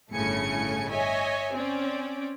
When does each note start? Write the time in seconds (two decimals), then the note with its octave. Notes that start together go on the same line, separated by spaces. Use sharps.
0.13 G1 A2 C#3 A3 G#5 C#7
0.90 C#5 D#5 E5 G#5
1.54 C4 C#4 D5